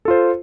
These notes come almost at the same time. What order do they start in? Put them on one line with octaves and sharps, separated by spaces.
A4 F4 C5